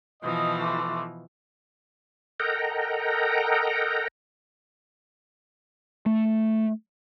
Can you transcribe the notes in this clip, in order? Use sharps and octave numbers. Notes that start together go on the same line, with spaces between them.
B2 E3 F3 D#5
A3 C6 D6
A4 A#4 D#5 F#5 G5 A#5
A3